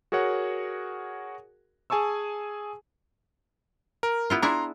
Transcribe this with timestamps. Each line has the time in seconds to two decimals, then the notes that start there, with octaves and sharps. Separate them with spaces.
0.12 F#4 G#4 A#4 C#5 F#5
1.90 G#4 G#5 A5 C#6 E6
4.03 A#4
4.30 B3 E4 F4
4.42 D4 E4 G#4 A#5 C6